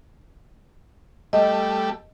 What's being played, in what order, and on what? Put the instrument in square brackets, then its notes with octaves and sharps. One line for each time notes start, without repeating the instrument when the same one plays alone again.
[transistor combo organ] G3 A3 [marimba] D#5